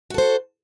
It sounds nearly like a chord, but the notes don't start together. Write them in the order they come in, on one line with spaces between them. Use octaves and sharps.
F#4 A4 C5